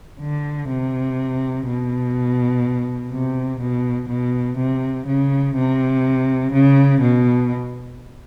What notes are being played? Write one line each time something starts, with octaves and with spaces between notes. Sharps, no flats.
D3
C3
B2
C3
B2
B2
C3
C#3
C3
C#3
B2